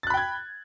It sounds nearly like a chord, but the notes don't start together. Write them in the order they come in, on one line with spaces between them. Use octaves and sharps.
A6 F#6 B5 G5 G#6